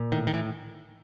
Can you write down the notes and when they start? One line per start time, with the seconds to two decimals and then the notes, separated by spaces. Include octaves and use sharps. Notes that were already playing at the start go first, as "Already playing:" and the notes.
Already playing: A#2
0.12 A2 D#3
0.27 D#3
0.33 A2 E3